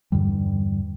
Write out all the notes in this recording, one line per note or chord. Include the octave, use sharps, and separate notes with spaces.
E2 G2 D3 G3